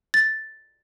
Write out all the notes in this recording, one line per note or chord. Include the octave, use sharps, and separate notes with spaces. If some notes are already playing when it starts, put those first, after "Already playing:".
A6